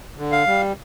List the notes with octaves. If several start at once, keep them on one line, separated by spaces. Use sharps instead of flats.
D3
F5
G3